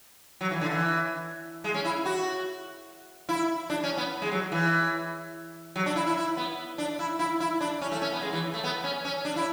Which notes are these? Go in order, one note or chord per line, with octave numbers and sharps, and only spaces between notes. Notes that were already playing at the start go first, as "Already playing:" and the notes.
F#3
E3
D3
E3
G#3
C#4
E4
F#4
E4
D4
C#4
B3
G#3
F#3
E3
F#3
D4
E4
E4
E4
B3
D4
E4
E4
E4
D4
C#4
A3
C#4
B3
G#3
E3
A3
B3
C#4
C#4
D4
E4